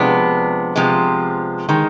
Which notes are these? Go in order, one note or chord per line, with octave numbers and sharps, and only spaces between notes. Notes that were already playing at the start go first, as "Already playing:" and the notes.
Already playing: C3 F3 G#3 B3 D4
C3 F3 G#3
D#3 G#3